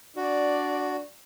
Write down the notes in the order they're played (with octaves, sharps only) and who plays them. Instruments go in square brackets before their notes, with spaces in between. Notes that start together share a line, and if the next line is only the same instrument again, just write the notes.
[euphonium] D4 [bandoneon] F#4 [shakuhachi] D5